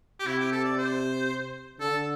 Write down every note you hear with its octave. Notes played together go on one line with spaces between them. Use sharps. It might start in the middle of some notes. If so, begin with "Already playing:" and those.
G4
C3 E4
G4
A4
D5
C5
D3 A4